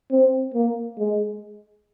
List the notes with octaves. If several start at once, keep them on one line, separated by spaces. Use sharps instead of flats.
C4
A#3
G#3